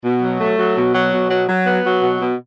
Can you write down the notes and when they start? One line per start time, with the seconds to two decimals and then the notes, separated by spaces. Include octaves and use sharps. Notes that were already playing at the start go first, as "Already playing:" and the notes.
0.04 B2
0.22 F#3
0.40 A3
0.58 F#3
0.76 B2
0.94 F#3
1.12 B2
1.30 F#3
1.48 F#3
1.66 B3
1.84 F#3
2.02 B2
2.20 B2